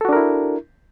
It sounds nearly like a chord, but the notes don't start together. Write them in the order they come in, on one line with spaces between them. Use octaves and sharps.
A4 F#4 D4 A#4 E4